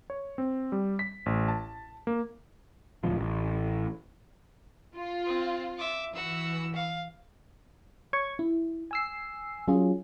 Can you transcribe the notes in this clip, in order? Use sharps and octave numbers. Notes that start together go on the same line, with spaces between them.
C#5
C4
G3
B6
A1
A5
A#3
D1 C#2 B2 F3
A1
F4
C4
E5 D6
E3 F#4 E6
F5
C#5 C#6 G#6
E4
G#5 E6 C7
F#3 C#4 F4 G#4